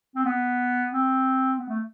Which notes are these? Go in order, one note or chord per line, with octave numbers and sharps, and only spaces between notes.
C4
B3
C4
B3
A3